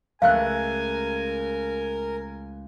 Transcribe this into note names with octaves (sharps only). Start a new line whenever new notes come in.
C#2 A3 A#4 F5 G#5 F#6